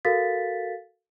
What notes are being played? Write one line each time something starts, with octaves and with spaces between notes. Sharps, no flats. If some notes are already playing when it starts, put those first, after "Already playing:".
F#4 A4 A#4 F5 A6 B6